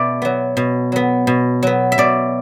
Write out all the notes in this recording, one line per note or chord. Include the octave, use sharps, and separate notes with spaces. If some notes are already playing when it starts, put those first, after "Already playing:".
Already playing: B2 D5 E5
F#3 B3
B2
F#3 B3
B2
F#3 B3
E5
B2 D5